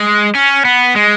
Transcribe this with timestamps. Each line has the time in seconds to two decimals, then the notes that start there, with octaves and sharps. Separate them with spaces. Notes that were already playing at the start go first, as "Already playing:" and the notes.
Already playing: G#3
0.35 C#4
0.65 B3
0.96 G#3